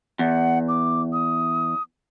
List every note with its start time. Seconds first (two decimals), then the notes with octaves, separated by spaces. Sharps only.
0.19 E2 F#5
0.68 D6
1.13 D#6